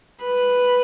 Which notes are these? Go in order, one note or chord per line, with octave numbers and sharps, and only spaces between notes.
B4